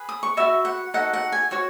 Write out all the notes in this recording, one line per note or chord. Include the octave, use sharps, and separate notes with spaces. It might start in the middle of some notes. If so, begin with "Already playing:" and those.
Already playing: G#4 B4
D#6
C#6
F#4 B4 D#5 E5
F#5
D#4 F#4 A4 F#5
F#5
G#5
F#4 C#5 F#5